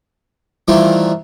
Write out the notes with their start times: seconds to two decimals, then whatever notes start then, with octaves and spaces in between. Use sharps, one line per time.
0.68 D#3 E3 G3 A3 C4 F4